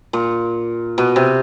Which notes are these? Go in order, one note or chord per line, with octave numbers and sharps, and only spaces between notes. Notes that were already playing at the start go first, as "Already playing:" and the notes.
A#2
B2
C3